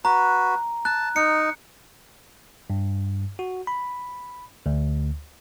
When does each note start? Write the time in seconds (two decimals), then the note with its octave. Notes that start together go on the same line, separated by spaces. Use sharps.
0.05 F#4 B4 A#5
0.85 A5 F#6
1.16 D#4 C#7
2.70 G2
3.39 F#4
3.67 B5
4.66 D2